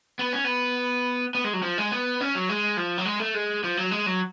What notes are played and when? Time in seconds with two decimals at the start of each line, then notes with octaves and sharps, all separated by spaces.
0.19 B3
0.33 C#4
0.45 B3
1.35 B3
1.44 G#3
1.53 F#3
1.62 F3
1.78 G#3
1.92 B3
2.21 C#4
2.35 F#3
2.49 G#3
2.77 F3
2.98 F#3
3.05 G#3
3.20 A3
3.34 G#3
3.64 F3
3.77 F#3
3.91 G#3
4.06 F#3